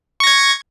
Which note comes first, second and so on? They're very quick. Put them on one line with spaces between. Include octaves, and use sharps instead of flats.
C#6 A#6 G#6